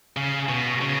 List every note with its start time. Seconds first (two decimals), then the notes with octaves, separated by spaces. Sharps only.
0.17 C#3
0.49 B2
0.82 C#3